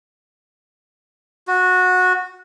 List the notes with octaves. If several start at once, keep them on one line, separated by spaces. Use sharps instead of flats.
F#4